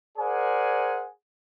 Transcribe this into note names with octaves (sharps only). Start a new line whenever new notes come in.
G#4 A#4 C5 D5 F#5 G#5